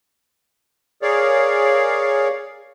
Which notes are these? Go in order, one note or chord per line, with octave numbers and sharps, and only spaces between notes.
G#4 A#4 C#5 D5 F5